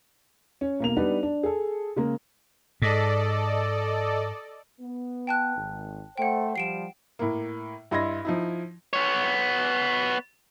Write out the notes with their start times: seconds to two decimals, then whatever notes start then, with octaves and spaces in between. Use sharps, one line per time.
0.61 C#4
0.80 B1 A#3 F7
0.97 G3 B3 D4 D#4 B4 D5
1.23 D4
1.43 G#4 A4
1.96 C#3 G#3 A#3
2.82 G#2 A4 D5 D#5
4.81 B3
5.27 G5 A5 F#6
5.57 G#1
6.18 A3 C5 F#5 G5
6.56 F3 G3 C7 D7 E7
7.19 A2 A#3
7.91 G2 E4 D#5 C6 G#6 A#6
8.25 F3 D#4 E4
8.93 B3 C#5